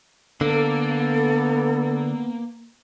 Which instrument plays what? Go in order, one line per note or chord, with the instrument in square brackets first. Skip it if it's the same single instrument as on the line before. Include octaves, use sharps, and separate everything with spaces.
[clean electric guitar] D3 [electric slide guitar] A#3 [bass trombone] B3 [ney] A4